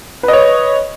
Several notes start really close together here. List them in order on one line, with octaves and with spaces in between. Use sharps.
B4 D#5 C#5